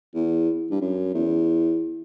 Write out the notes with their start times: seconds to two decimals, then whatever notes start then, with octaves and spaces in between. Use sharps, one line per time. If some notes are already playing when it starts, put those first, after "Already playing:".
0.15 E2
0.71 G2
0.81 F#2
1.14 E2